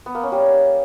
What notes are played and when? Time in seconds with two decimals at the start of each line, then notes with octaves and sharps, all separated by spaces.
0.06 B3
0.15 A#3
0.23 C#4
0.32 G3